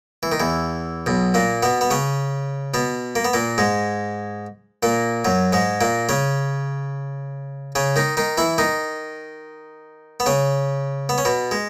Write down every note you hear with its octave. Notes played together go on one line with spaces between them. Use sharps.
E3
D#3
E2 E3
B1 B2
A#2 A#3
B2 B3
B3
C#3 C#4
B2 B3
A#3
B3
A#2 A#3
G#2 G#3
A#2 A#3
F#2 F#3
G#2 G#3
A#2 A#3
C#3 C#4
C#3 C#4
D#3 D#4
D#3 D#4
E3 E4
D#3 D#4
B3
C#3 C#4
B3
C#4
B2 B3
G#3